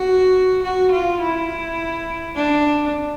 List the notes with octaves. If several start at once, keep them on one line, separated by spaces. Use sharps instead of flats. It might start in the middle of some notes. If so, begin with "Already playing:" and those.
Already playing: F#4
F#4
F4
E4
D4